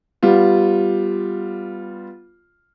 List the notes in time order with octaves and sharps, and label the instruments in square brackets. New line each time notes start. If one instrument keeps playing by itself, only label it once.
[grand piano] G3 B3 F4